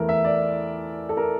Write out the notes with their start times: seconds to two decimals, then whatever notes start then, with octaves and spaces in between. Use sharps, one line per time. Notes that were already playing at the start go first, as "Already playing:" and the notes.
Already playing: E2 E3 A3 A#4
0.09 E5
0.24 D5
1.09 A4
1.17 A#4